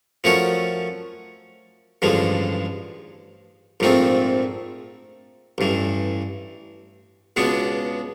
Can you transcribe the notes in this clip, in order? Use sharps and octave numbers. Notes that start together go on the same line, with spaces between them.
F3 A3 C#4 F#4 A#4
A1 G2 D3 F3 G#3
A#1 G#2 F3 A3 C4
A1 G2 E3
C#2 B2 G#3 B3 D4